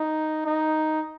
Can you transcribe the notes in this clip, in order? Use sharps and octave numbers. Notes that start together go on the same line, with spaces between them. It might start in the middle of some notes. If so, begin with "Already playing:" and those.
Already playing: D#4
D#4